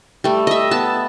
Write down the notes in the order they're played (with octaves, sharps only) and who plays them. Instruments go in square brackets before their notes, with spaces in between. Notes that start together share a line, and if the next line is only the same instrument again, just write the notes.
[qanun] G3 A3
D#5 E5
B3 A5